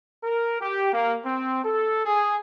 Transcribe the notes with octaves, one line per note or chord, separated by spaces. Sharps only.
A#4
G4
A#3
C4
A4
G#4